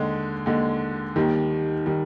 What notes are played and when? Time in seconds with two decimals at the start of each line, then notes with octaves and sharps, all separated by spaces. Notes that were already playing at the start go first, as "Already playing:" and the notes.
Already playing: D#2 D3 G#3
0.46 D#2 D3 G#3
1.16 D#2 D#3 G3
1.86 D#3 G3